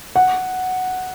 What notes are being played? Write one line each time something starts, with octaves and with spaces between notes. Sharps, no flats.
F#5